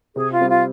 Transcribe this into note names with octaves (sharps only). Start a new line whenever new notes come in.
C3 G#4
F4
G3 C4
F4